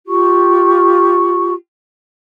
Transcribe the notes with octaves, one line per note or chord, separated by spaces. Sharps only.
F4 G4 C#6